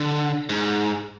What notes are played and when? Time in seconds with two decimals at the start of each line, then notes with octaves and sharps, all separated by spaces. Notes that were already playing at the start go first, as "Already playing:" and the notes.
Already playing: D3
0.49 G#2